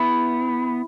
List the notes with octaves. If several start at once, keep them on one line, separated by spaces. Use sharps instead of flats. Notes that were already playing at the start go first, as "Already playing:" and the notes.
Already playing: B3 E4